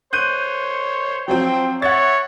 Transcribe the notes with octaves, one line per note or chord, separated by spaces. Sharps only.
C5 C#5 F#6 G6 D#7
F3 F#3 C4 C5 G5
C#5 E5 F#5 A6